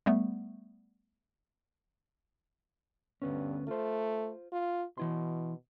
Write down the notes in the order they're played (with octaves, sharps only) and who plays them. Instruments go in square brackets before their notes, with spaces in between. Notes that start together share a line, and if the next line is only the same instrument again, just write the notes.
[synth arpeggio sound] G3 A3 B3
[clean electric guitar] D2 B3 C#4 [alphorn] G2
[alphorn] A3 [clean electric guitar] F4 C5
[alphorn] F4
[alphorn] B2 [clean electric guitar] E3 E4 C6